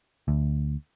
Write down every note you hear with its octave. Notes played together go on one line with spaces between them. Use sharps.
D2